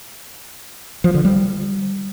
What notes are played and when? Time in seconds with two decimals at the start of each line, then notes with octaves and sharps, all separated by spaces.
1.04 F3
1.14 D3
1.25 G3